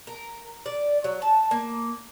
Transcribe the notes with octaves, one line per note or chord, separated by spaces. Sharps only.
A#4
D5
F#3
A5
A#3